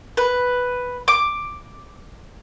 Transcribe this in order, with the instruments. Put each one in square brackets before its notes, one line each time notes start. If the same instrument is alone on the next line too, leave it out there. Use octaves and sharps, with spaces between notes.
[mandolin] B4
D6